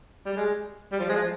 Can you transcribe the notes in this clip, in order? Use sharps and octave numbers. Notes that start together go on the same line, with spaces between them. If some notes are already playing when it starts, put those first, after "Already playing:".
G3
G#3
G3
F3
G#3
F3